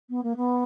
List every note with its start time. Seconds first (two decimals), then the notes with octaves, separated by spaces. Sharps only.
0.09 B3
0.23 A#3
0.36 B3